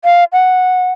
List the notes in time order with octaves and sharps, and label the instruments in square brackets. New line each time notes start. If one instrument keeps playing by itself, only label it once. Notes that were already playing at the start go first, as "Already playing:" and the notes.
[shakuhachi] F5
F#5